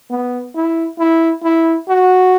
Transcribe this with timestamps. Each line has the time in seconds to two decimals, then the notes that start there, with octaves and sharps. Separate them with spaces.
0.10 B3
0.55 E4
0.99 E4
1.43 E4
1.89 F#4